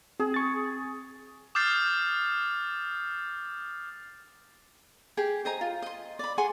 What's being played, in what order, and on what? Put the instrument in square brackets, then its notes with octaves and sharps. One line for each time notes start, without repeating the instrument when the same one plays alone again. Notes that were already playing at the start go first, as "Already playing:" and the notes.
[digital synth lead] C4 [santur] G#4
[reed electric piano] C#6 A6
[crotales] D6 D#6 F6 G6 A6 C7
[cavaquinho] G4 G#4 G5
C5 D#5 G#5 A#5
F4
D#5 C6
D5 B5
G#4 F#5 G#5 C6